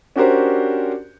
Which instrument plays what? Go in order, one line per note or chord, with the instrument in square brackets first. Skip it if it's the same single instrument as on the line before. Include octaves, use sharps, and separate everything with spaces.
[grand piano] C#4 D4 F#4 G4 A#4 C5